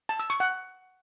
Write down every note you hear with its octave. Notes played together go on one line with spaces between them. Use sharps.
A5
E6
C#6
F#5